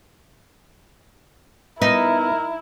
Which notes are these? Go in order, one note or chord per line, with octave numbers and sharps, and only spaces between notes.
B3 D#4 E4 A#4